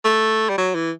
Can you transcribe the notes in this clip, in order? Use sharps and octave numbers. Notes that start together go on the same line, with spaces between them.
A3
G3
F#3
E3